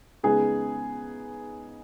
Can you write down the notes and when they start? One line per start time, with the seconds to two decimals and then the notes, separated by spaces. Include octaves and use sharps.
0.23 C#3 G#3 B3 D#4 G#4